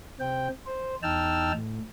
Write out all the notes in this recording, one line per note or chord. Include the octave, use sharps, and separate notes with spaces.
C3 C4 G5
C5
E2 D#4 G5 A5 E6 F6
A2